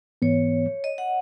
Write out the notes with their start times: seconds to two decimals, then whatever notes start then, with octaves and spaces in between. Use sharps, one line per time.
0.22 G#2 E3 B3 C#5
0.84 D#5
0.98 F#5